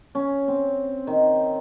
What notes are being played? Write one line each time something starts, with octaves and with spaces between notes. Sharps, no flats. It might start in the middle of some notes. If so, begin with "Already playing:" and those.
C#4
C4
D#3